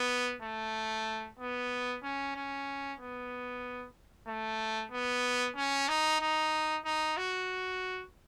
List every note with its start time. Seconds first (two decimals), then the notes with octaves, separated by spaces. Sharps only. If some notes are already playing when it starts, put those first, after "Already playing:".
Already playing: B3
0.42 A3
1.39 B3
2.03 C#4
2.36 C#4
3.00 B3
4.27 A3
4.91 B3
5.56 C#4
5.88 D#4
6.20 D#4
6.85 D#4
7.17 F#4